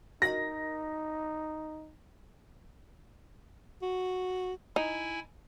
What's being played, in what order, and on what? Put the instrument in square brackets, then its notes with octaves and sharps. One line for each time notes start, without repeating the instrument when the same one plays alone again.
[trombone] D#4 [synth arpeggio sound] F#4 A#4 D#5 [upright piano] A#6
[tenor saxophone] F#4
[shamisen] D#4 [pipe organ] E4 G#5